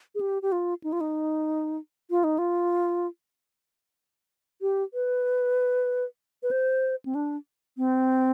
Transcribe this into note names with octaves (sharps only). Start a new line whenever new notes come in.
G#4
G4
G4
F4
D#4
F4
D#4
F4
D#4
F4
G4
B4
B4
C5
C4
D4
C4